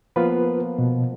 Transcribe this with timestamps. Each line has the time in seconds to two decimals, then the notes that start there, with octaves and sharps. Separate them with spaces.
0.16 F3 A#3 B3 F4 B4
0.78 B2